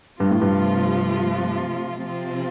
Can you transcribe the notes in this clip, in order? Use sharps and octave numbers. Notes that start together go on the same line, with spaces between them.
G2 C3 F3 A3 F4
A2
G2
C3 F3 C4 F4